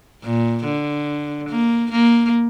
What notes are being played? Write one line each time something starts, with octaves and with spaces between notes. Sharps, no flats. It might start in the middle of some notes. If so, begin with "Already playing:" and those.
A#2
D3
A#3
A#3